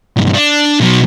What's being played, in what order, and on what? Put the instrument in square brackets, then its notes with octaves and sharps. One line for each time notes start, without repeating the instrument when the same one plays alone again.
[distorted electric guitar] B1 G2
D4
B2 F#3